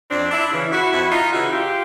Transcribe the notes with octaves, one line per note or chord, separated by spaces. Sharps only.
F2 C4 D4
D4 E4
C#3 E3
E4 F#4
F2 E4 F#4
D#4 F4
C#3 E3 E4 F#4
F4 G4